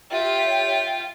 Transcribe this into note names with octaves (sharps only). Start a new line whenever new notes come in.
F4 G4 A4 C#5 E5 G5